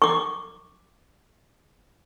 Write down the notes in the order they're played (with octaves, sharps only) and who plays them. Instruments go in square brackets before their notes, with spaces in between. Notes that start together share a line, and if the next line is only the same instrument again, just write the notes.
[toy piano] C#6 D6